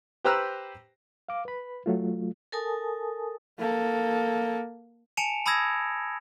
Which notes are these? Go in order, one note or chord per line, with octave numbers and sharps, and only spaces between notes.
G4 B4 C5 A#5 E6 F#6
F5 D6
B4 B5
F#3 A3 F4
A4 A#4 G#5 A5 D#6
A#3 A4
G#5 A5 C#7 D7 E7 F7
A5 B5 D#6 E6 G#6 A#6